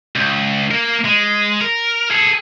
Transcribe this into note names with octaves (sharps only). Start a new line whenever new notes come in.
C#2
A#3 A#4
G#3
A#4
G#4 A4